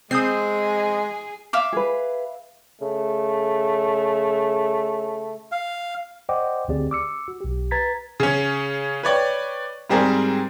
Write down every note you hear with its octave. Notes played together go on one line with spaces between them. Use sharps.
G#3 C4 G#4 D#6 G6 C7
E5 F5 D6
G#4 B4
C#3 A3
F5
C5 D5 D#5 F#5 G5 D6
D2 D3 C4 G4 G#4 D5
D6 E6 C#7
F#4
B1 G4
B4 A#5 G#6 A6 B6
C#3 C#4
B4 C#5 D5 G5
G#2 G3 C4 G#4 A#4 D5